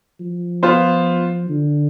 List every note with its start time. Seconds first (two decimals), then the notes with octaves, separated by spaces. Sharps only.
0.20 F3
0.63 B3 F4 C5
1.49 D3